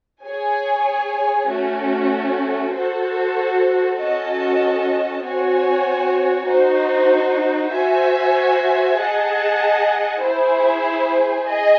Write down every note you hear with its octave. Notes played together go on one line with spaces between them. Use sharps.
G#4 C#5 G#5
A3 C#4 F#4
F#4 A4 C5
C#4 F#4 A4 D#5 A5
C4 F#4 C#5 G#5
D#4 F#4 C5
F#4 C5 E5 G#5
G#4 D#5 F#5 A5
E4 G#4 C5
G#4 D#5 G#5